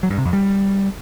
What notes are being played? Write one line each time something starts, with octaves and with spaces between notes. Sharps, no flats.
F#3
G2
C3
F2
G3